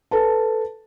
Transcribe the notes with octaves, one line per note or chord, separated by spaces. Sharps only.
A4 B4 A5